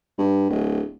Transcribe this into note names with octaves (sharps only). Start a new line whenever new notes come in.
G2
D1